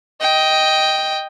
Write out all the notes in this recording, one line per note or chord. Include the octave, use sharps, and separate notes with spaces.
D#5 G5